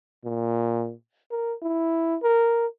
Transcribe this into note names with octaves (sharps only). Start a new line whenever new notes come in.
A#2
A#4
E4
A#4